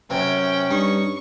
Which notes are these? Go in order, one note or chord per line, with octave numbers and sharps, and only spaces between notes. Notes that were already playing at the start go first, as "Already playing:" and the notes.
F#2 C3 C#4 G5
G2 D#4 C#6